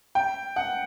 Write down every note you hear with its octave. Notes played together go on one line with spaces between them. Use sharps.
G5
F#5